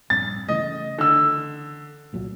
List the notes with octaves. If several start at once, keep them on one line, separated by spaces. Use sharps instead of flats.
A#1 G2 C4 A6
C#3 E3 A3 D#5
D3 E6
C2 A#2 F#3